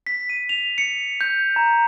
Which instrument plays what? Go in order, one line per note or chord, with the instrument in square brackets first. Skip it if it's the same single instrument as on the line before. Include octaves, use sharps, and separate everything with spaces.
[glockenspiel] B6
D#7
F7
C#7
G6
A#5